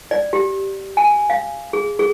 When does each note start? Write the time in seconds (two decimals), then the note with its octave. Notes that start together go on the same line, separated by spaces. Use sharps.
0.11 D5
0.33 G4
0.97 G#5
1.30 F5
1.73 G#4
1.99 G#4